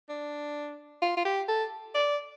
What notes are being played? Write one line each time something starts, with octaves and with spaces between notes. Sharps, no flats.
D4
F4
F4
G4
A4
D5